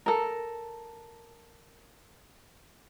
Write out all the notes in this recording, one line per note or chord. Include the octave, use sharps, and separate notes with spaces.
A4 A#4